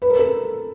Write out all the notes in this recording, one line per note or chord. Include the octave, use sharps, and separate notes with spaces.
B4
A#4
A4